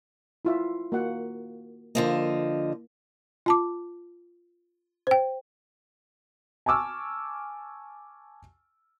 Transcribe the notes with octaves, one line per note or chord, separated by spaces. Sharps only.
E4 F4 E5
A#3 F#4 F#5
D3 F3 A#3 D#5
F4 A5 D6
C5 G5
G#5 A5 C#6 D6 E6 F6